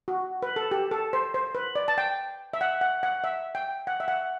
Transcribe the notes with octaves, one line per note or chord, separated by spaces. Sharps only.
F#4
B4
A4
G4
A4
C5
C5
B4
D5
A5
G5
E5
F#5
F#5
F#5
E5
G5
F#5
E5
F#5